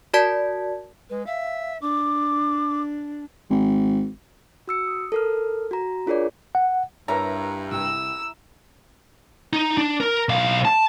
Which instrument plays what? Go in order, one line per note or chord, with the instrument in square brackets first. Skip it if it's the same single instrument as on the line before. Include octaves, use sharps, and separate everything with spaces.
[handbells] F#4 A#4 D5 A5 G#6 B6
[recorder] G#3 [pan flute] B4
[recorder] E5 [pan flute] F5
[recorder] D4 [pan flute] D6
[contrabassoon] G#1
[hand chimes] F#4 E6 C#7
D#6
A4 A#4 F6
F#4 A#5
D4 F4 G#4 A#4 C#5 D5
[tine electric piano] F#5
[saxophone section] G2 [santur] E4 E5 A#5 [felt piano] A#4 B4 C#5
[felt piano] C2 G5 [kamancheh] E6
[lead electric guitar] D#4
D4
A#4
B1 F5
A5